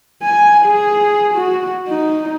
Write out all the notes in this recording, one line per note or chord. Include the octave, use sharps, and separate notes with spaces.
G#5
G#4
F#4
D#4